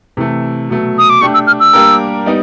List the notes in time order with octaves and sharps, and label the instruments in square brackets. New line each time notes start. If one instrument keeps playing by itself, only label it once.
[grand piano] C3 E3 A3
B2 F#3 A3
[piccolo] D#6
D6
[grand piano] A3 D4 G4 [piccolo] C#6
[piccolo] E6
F6
E6
[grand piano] G3 A#3 D4 G4 A#4
G3 B3 D#4